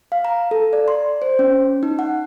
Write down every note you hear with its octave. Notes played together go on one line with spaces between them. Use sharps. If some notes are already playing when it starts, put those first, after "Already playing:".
F5
A#5
A4
D5
C6
C5
C#4
D#4
F#5